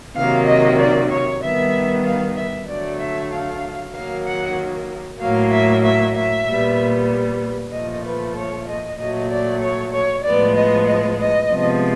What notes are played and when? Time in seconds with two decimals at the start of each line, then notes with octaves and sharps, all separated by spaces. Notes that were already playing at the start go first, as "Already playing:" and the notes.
0.16 C3 D#3 F#3 A#3 F5
0.48 D#5
0.80 D5
1.11 C#5
1.42 D#3 G3 B3 E5
2.06 F5
2.37 E5
2.69 D3 F#3 A3 D5
3.00 E5
3.32 F5
3.95 D#3 F#3 A#3 F5
4.26 F#5
5.21 A2 F#3 A#3 F5
5.52 E5
5.84 E5
6.16 E5
6.47 A#2 G3 B3
7.73 A#2 F3 A3 D#5
8.05 B4
8.37 C#5
8.68 D#5
8.99 A#2 F#3 A3 D#5
9.31 D5
9.62 C#5
9.94 C#5
10.25 A2 F3 G#3 B3 D5
10.57 D#5
10.89 D#5
11.20 D#5
11.52 C3 F3 G#3 B3